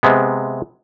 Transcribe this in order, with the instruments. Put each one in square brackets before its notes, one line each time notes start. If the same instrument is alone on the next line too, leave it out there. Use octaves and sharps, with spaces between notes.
[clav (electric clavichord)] C3 G#3 B3